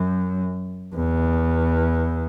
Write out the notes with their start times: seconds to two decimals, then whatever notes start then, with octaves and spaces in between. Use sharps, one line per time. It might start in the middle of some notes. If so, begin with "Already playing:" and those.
Already playing: F#2
0.95 E2